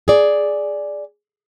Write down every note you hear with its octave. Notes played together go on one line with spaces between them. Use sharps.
G#4 D5